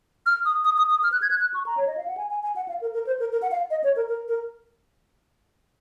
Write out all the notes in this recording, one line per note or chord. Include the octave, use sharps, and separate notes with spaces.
F6
D#6
D#6
D#6
D#6
F6
F#6
G#6
F#6
F#6
C#6
A#5
C#5
D#5
F5
F#5
G#5
G#5
G#5
F#5
F5
A#4
A#4
C5
A#4
A#4
F#5
F5
D#5
C#5
A#4
A#4
A#4